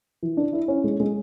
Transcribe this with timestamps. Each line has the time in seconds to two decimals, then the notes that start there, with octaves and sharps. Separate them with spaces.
0.23 E3
0.37 D4
0.53 E4
0.68 C#4
0.84 G#3
1.00 G#3